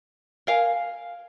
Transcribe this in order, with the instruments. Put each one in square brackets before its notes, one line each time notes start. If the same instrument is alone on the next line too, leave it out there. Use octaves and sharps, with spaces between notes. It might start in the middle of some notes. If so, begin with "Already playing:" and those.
[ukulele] A#4 F5 G#5